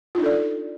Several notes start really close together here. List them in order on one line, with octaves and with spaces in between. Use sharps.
F4 D#4 D4 A4 D5